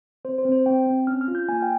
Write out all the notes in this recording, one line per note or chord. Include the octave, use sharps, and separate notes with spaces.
C4 C5
C5
C4
C5
C4 G5
C4
C#4 F6
F6
F4
G6
A#3 G#5
G5